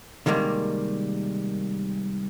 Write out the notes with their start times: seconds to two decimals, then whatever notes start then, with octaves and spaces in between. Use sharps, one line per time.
0.26 C3 D#3 G3 G#3 A#3